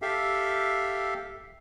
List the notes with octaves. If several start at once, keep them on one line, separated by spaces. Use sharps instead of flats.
G4 A4 E5 F5